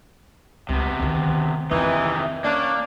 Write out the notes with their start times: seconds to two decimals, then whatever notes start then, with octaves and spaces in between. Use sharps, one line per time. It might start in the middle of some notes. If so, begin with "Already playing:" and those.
0.69 C#2 C3 B3
1.00 D2 D#3
1.71 F2 C3 D#3 E3 D#4
2.44 A#3 C#4 D4